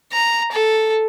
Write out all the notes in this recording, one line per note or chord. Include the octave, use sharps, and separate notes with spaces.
A#5
A4